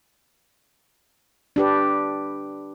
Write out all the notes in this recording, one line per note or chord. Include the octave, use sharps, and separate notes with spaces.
D4 G4 B4